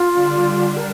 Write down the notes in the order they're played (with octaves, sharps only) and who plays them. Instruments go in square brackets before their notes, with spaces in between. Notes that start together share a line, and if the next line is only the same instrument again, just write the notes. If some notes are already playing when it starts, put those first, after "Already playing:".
Already playing: [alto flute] F4
[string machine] D3 G3 D4
[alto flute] A#4